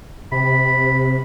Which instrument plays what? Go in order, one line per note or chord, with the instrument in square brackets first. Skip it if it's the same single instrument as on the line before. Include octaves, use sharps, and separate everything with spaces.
[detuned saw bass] C3 [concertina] B5